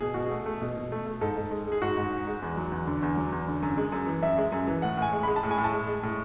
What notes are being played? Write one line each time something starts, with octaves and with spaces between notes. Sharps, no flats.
B2 G#4
B2 F#4
G#4
A3
A3
B2
B2
A3
A3
G#2 A4
G#2
G#3
G#3 G#4
G#2 F#4
G#2
G#3
G#3
E2
F#3
E2
D3
E2
F#3
E2
D3
F#2
G#3
F#2
E3
F#2 E5
G#3
F#2
E3
A2 F#5
A2
G#5
G#3
G#3 B5
A5
A2
G#5
A2
A5
G#3
G#3
A2